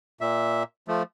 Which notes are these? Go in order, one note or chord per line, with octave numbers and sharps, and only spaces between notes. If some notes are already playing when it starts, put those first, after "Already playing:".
A#2 E5
F3 A3